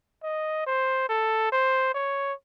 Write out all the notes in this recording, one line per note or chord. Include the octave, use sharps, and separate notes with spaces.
D#5
C5
A4
C5
C#5